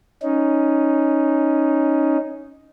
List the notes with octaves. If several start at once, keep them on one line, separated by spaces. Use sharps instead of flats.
C#4 D#4